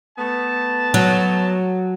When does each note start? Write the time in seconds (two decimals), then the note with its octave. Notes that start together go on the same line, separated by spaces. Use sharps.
0.19 A3 B3 A5
0.94 F#3